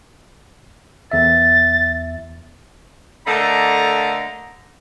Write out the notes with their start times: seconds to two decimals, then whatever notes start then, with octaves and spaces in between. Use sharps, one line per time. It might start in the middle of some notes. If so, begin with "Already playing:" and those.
1.11 E2 E5 A6
3.26 D3 A3 A#3 D#5 A#5